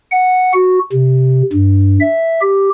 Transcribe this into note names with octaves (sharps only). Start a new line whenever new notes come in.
F#5
F#4
C3
G2
E5
G4